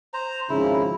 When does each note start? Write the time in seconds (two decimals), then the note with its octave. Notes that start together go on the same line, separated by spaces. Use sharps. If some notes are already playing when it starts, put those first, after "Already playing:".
0.14 C5 A#5
0.50 G#1 C#3 F3 E4